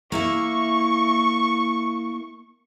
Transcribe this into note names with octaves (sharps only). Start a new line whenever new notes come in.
A#3 E4 E5 C#6